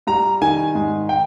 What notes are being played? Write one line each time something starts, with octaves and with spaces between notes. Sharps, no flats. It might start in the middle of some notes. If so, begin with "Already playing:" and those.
G3 A#5
D#3 G#5
G#2
G5